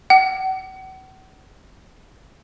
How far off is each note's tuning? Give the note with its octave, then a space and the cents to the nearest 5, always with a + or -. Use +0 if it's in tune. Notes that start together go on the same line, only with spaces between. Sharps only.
F#5 +40